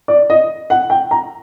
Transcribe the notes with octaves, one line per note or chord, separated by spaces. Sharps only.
D5
D#5
F#5
G5
A#5